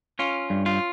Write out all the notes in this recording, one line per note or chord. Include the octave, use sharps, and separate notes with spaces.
C#4 F4
G2
F4